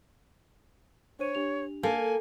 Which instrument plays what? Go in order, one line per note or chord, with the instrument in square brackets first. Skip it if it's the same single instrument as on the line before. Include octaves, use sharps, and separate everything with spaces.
[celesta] D4 C5 D#7 [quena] C#5
[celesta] D4 G4 F7
[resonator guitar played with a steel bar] A#3 [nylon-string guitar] A4 [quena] G#5